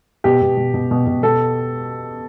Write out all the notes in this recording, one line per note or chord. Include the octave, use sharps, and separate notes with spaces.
B2 G4
B2
B2
B2
B2
B2
B2 A4